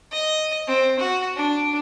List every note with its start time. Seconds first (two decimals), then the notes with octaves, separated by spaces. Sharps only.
0.12 D#5
0.68 C4
0.99 F#4
1.36 D4